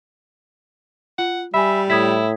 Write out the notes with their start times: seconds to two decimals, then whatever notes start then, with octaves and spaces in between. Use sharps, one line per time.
1.19 F4 F#5
1.54 G3 E5 G#5 B5
1.90 A2 E4 D#6 G#6 B6